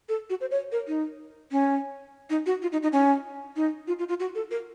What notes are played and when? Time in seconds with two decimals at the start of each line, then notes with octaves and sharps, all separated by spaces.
0.09 A4
0.30 F#4
0.41 C5
0.51 C#5
0.72 A#4
0.88 D#4
1.52 C#4
2.30 D#4
2.46 F#4
2.62 F4
2.72 D#4
2.83 D#4
2.93 C#4
3.56 D#4
3.88 F4
3.99 F4
4.09 F4
4.20 F#4
4.35 A4
4.51 A#4